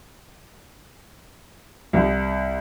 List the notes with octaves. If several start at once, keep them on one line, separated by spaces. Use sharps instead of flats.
C2